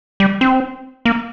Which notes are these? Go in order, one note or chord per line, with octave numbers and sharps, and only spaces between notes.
G3
C4
A#3